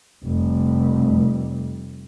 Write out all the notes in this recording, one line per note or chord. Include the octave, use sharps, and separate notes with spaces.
F1 G3